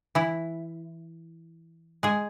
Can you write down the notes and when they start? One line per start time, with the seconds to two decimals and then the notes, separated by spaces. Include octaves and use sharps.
0.15 E3 E4
2.03 G#3 G#4